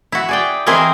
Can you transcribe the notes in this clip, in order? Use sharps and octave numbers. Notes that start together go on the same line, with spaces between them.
E4 F#4
G#4 D5 G5
E3 C4 E4 G#4 A#4 D#5